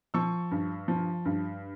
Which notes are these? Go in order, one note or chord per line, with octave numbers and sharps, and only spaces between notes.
F3 C#6 E6
G2
F3
G2